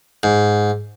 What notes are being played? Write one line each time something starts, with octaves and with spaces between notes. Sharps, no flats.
G#2